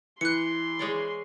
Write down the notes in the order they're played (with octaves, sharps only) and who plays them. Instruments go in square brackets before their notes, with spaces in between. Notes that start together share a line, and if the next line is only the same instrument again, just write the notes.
[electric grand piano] E3 [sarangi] C6 [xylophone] F#6 C#7
[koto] G#3 C#5 D5